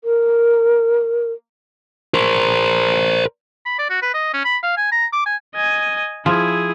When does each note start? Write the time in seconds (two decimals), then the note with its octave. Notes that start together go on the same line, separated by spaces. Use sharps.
0.04 A#4
2.14 A#4 C5
3.66 B5
3.79 D5
3.90 F#4
4.02 B4
4.14 D#5
4.34 C#4
4.45 B5
4.63 F5
4.77 G#5
4.92 A#5
5.13 D6
5.26 G#5
5.55 D#5 G#5
6.26 F3 E4 G#4